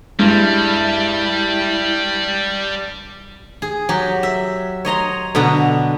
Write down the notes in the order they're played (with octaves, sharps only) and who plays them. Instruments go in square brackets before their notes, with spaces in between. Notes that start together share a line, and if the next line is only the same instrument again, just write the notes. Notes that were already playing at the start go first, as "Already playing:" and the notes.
[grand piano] G2 [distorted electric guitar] G3 [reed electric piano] G#3 [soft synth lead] E4
[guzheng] G#4
F#3 G4
E5
C#5 D#5 A#5 C6
B2 D3 B3 A#5